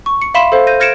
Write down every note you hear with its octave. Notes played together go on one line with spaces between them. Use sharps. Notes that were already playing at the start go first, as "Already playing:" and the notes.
C#6
C#7
E5 F5 B5 C6 B6 E7
A4 C5 F5
G6 A#6 D#7
F6 G#6 A#6 C#7 D7 E7